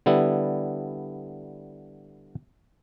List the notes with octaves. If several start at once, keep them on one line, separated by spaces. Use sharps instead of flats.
D3 G3 B3 E4